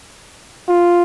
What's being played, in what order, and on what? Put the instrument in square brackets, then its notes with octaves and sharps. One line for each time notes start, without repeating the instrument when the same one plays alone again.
[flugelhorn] F4